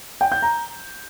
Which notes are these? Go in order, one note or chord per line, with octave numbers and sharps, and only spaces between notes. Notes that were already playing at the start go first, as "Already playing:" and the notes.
G5
G6
A#5